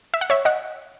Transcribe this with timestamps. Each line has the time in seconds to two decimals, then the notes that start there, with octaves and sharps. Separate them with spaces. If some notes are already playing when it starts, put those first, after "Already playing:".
0.14 E5
0.21 F#5
0.30 C#5 E5
0.45 D#5 F#5